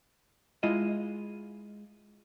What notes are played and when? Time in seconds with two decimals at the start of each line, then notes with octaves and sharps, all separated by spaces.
0.63 G#3 E4 F4 D#5